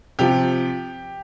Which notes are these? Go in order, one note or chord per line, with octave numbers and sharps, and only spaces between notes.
C3 F3 G4